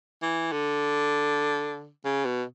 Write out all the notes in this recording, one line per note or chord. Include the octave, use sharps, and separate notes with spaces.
E3
D3
C#3
B2